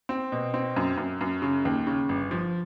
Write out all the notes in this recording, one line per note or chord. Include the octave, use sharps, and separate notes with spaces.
C4
B2
C4
F#2
F#2
F#2
C#3
D#2
C#3
G1
F3